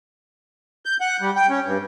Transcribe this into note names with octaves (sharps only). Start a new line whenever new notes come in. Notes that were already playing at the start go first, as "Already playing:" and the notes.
G6
F#5
G3
G5
C#4
G2